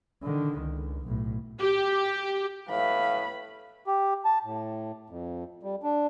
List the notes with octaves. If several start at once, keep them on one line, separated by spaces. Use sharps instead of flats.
D3 D#3
C#2
B1 A2
G4
A2 B4 F5 B5
G4
A5
A2
F2
G3
D4